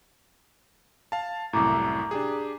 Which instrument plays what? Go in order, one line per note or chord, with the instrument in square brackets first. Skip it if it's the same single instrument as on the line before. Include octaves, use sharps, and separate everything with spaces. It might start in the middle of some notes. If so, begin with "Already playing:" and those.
[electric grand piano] F5 A5
[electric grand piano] C2 F#2 A2 [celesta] A#5 D6
[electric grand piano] D4 G4 G#4